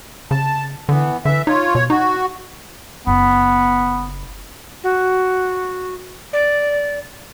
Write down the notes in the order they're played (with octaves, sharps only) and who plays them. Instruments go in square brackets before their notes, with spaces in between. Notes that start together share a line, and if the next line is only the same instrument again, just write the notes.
[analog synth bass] C#3 [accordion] A5
[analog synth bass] D3 [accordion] E3 B3
[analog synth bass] D3 [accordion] E3 E5
[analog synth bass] D#4 [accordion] F4 C#5
[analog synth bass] B2 [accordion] C#5
[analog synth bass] D#4 [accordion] F#4
[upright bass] F#1 [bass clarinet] B3
[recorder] F#4
D5